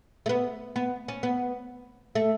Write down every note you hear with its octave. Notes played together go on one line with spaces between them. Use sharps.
A3
B3
B3
C#4
B3
A3